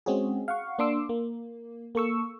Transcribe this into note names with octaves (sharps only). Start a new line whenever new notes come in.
G#3 C4 C#4 F#4 G#4
F5 F#5 C#6
A#3 D4 C6 D6 E6
A#3
A#3 A4 C#6 E6